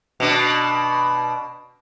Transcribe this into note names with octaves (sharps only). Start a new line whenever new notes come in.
B2 D4